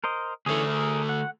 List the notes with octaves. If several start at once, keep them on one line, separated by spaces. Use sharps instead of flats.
A#4 C5 D#5
D2 E3 A3 C#4 G#4
G#4 A#4
F#5